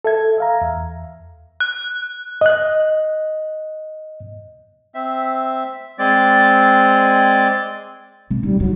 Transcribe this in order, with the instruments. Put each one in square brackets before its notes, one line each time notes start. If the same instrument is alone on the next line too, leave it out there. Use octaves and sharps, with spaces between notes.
[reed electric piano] A4 E5 G#6
E5 F5 A#5
E2
[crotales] F#6
[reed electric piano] D#5 F#6
[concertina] C4 E5
G#3 C4 D5
[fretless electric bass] C3 [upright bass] E3
[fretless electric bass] D2 C3 C#4 [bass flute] G3 [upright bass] D#4
[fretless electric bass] A1 [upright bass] G2 D#4 [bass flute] F#3